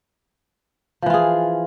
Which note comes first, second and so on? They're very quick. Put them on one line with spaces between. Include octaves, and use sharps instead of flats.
F3 E3 F4 G#4